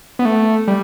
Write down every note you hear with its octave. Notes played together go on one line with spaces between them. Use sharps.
B3
A3
G3